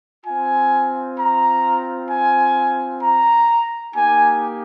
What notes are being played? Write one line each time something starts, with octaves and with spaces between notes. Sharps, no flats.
C4 F4 G#5
A#5
G#5
A#5
A#3 D#4 G4 G#5